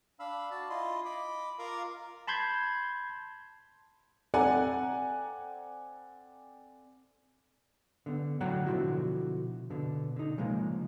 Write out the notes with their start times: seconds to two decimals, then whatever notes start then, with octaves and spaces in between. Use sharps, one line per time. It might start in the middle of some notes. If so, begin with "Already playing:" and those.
0.20 D4 F5 B5 E6
0.51 F#4 D5 A5
0.70 E4 F4 D#5 C6
1.05 D#5 B5 D6
1.59 F4 A#4 F5 A#5 D6
2.27 A5 B5 C6 G6 G#6
4.34 C4 A4 D5 F#5 G#5 A#5
8.06 D3 B3
8.40 A2 D3 F#3 F#5 G5 A#5
8.66 B2 D3 E3 F3 E4 F#4
9.70 B2 D3
10.16 D3 D#4
10.38 C#3 F3 G#3 A#3